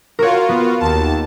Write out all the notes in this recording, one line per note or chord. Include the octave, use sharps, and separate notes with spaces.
F4 F#4 A#4 C#5
B3
D#2 A5